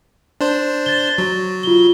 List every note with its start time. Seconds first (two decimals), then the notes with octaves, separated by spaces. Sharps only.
0.41 D4 C5
0.86 A6 G7
1.18 F#3
1.63 F4 G7